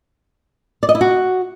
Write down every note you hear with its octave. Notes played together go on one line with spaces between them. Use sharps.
D5
D#5
E4
F#4